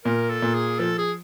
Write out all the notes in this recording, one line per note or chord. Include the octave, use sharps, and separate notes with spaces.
A#2 A#4
A4
A#2
G#4
F3 A4
G#4